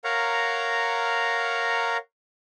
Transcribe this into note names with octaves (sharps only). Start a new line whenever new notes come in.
A#4 C#5 F5 F#5 A#5